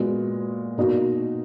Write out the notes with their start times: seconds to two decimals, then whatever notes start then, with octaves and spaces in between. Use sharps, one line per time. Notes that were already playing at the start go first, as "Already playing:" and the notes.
Already playing: A#2 G#3 B3 F#4
0.78 B2 A#3 D#4 F#4